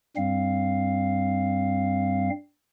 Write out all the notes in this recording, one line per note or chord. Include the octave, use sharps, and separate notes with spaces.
G2 G3 C4 F5